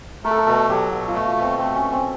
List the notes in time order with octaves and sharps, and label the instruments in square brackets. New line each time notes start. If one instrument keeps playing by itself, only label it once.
[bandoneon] A3 [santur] A#4
[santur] A4
A#4
[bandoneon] B2 [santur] A4
[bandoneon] F#3 [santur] G4
[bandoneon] B2 [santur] F#4
[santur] F4
[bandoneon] A3
[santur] F#4
[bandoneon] B2
[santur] C4
[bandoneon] A3 [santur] C4
[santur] C#4
[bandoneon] B2
[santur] C4